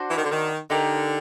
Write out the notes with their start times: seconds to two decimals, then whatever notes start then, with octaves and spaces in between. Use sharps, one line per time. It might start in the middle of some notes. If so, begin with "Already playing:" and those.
Already playing: D4 F#4 C5
0.09 E3
0.16 D#3
0.23 D3
0.31 D#3
0.70 D3 D#4 G4 A#4